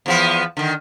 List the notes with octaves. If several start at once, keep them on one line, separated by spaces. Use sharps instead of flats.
E2 F3 B3
D3 D#3